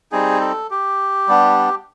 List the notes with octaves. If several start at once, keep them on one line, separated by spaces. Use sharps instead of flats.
G3 C4 D#4 G#4
A4
G4
G3 B3 D4